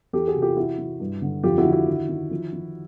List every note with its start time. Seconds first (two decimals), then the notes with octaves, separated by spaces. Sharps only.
0.13 E2 G4 A4
0.28 F#4 G#4
0.35 C3
0.42 F4 G4
0.56 E3 E4 F#4
0.78 E3
1.00 G2
1.22 D3
1.43 F2 F4 G4
1.58 E4 F#4
1.66 D3
1.72 E4 F#4
1.87 D#3
2.09 D#3
2.31 F3
2.53 F3